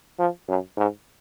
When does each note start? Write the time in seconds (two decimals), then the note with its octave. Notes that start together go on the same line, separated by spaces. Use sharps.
0.19 F3
0.48 F#2
0.77 G#2